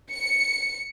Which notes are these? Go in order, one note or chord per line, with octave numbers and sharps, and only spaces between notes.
C#7